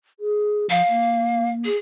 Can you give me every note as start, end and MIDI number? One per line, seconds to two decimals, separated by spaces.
0.20 0.66 68
0.70 0.82 53
0.70 1.50 77
0.90 1.68 58
1.65 1.76 68